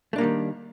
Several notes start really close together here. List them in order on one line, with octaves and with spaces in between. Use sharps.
A3 D4 A#3 G3 D#3